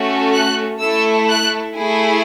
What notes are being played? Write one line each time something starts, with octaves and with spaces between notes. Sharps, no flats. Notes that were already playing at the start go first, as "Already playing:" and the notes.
Already playing: A3 C#4 F#4 A4
F#6
A3 E4 A4 E6
F#6
A3 E4 G#4